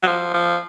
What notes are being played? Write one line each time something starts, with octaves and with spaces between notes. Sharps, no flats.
F#3
F3
F3